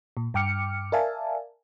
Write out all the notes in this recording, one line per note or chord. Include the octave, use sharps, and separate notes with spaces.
A#2
G2 G5 D6 F6 C#7
A#4 D5 E5 F5 G#5 A5